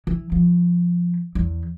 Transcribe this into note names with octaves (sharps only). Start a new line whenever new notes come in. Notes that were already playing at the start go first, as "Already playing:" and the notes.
E3
F3
E2